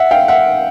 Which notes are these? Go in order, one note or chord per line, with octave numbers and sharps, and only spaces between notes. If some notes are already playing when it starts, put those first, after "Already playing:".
Already playing: E5 F#5
F5 G5
E5 F#5